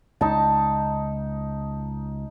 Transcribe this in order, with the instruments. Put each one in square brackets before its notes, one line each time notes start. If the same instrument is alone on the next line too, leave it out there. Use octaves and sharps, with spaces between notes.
[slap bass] C#2 [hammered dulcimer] D#4 A5